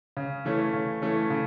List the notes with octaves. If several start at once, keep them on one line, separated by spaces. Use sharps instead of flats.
C#3
E3 A3 C#4
C#3
E3 A3 C#4
C#3